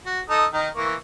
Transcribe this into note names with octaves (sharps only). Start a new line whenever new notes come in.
F#4
D#4 A4 D#6
D#3 D#4
E3 A#3 C#6